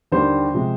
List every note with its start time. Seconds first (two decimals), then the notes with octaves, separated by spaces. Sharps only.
0.12 D#2 D3 G3 C5
0.54 C3 F3 G#3